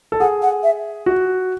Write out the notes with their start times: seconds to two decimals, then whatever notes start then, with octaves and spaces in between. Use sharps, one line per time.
0.12 A4
0.20 G#4 F#5
0.42 F#5
0.63 E5
1.06 F#4